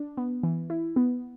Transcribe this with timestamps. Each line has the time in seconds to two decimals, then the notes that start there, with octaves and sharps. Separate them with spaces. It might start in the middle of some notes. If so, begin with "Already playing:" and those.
Already playing: D4
0.17 B3
0.43 E3
0.70 E4
0.96 B3